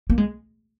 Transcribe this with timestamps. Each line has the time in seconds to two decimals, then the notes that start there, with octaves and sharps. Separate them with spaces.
0.10 A#3
0.18 G#3